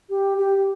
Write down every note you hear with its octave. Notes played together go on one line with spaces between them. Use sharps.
G4
G4